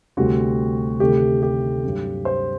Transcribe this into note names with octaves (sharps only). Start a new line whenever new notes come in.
D2 C3 G3 C4 F#4
D2 C3 D#3 A3 C4 G4
G4
G2 F#3 C4
C5